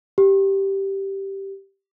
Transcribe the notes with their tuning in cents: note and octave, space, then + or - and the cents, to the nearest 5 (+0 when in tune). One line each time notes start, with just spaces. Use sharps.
G4 -5